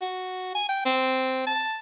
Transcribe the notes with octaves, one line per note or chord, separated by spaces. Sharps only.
F#4
G#5
G5
C4
A5